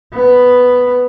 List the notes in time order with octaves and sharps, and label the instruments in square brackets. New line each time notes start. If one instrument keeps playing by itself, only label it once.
[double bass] B3